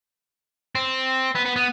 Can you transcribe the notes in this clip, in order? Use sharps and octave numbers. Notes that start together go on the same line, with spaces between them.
C4
B3
B3
B3